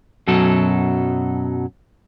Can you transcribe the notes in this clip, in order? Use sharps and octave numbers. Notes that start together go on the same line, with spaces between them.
F#2 B2 F#3 A4